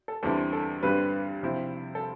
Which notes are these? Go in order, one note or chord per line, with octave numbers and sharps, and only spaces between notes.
A4
E2 D3 G3 C4 E4 A4
A4
G2 D3 G3 C4 B4
C3 F3 C4 E4
A4